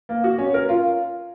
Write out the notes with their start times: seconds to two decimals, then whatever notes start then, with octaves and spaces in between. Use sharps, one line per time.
0.09 A#3
0.24 F#4
0.39 C#4
0.54 A#4
0.69 F4